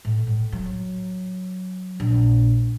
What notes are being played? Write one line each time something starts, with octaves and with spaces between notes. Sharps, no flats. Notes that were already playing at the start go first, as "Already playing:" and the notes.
A2
A2
F#3
A#1